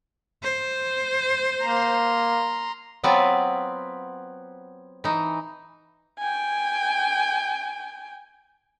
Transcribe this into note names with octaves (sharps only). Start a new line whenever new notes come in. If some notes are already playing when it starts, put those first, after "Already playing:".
C5
A#3 A#5 C6
F#3 B3 C4 F4 B4 D5
E3 D#4
G5 G#5